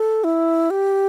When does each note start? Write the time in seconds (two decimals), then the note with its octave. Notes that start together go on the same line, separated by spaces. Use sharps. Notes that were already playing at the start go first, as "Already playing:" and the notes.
Already playing: A4
0.24 E4
0.70 G4